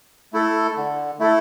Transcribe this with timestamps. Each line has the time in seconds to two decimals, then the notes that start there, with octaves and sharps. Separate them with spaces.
0.33 A3 E4 A4
0.76 D3
1.19 A3 E4 A4